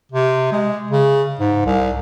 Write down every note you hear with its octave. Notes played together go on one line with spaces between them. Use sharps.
C3
G#3
C#3
G#2
C2